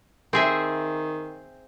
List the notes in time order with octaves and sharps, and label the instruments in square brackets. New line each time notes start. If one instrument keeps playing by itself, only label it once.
[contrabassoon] D#3 [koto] C4 G#4 E5